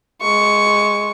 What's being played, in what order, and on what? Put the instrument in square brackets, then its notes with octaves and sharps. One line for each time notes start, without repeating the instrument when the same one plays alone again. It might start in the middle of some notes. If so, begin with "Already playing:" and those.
[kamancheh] G#3 C#6